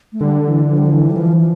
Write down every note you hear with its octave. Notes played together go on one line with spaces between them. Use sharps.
A3
D3 G3
E3
F3
G3
F3
E3
G3
E3 F3
F3